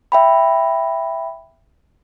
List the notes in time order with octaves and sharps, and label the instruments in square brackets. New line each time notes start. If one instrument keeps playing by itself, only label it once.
[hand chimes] E5 G5 B5